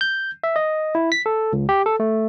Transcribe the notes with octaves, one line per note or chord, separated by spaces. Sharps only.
G6
E5
D#5
E4
B6
A4
C#2
G4
A4
A3